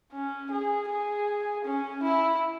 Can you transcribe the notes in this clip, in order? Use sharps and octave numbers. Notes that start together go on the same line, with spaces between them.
C#4
G#4
G#4
C#4
E4